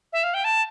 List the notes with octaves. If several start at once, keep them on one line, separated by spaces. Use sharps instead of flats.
E5
F5
G5
A5